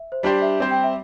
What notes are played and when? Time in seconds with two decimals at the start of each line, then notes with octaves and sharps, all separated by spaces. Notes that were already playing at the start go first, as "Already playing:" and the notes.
Already playing: E5
0.12 C5
0.23 G3 D4 G4 C5 D5
0.42 E5
0.60 G3 C4 G4 C5
0.71 G5
0.84 E5